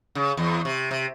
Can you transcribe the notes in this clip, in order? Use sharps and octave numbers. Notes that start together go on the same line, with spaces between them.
C#3
E2
C3
C3